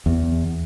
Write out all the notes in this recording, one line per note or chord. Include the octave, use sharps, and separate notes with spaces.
E2